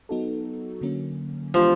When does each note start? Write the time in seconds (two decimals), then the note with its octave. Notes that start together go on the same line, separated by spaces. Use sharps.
0.09 F#3 B3 D#4 F#4 A4
0.81 D3 F#3 A#3 C#4
1.54 E3 F3 G#3 B3 D4 G4